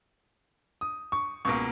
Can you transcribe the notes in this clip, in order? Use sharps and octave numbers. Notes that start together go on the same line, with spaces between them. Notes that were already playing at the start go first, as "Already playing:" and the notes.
D#6
C#6
C#2 B2 A#3 C#6